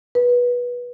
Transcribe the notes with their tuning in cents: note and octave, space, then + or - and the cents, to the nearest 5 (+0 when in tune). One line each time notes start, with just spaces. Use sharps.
B4 -20